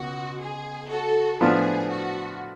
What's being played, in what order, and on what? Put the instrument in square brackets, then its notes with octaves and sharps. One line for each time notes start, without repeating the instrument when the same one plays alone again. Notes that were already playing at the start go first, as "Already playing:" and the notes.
Already playing: [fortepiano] C#2 B2 [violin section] F#4
[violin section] G#4
F#4 A4
[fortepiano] A2 F3 B3 D4 F4 [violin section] G#4
[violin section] F#4